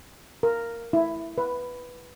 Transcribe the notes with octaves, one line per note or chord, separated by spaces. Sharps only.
A#4
E4
B4